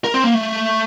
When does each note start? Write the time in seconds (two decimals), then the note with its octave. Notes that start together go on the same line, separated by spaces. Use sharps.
0.04 A#4
0.14 C4
0.24 A#3
0.34 A3